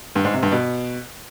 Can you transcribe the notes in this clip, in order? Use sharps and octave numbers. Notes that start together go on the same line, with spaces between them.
G2
G#2
C3
G2
B2